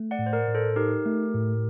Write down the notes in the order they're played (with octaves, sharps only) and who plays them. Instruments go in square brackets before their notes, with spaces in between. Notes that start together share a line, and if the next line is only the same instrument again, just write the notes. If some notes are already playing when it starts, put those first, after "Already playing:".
Already playing: [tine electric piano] A3
[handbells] D5 F#5
[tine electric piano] A2
[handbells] C5
A#4 D5
[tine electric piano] A2
[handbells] A4 C5
[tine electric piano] D#4 [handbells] G4 A#4
[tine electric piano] A3
A2